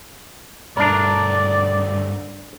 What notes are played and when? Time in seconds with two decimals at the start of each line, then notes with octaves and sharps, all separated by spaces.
0.77 G2 A3 D4 A#4 D5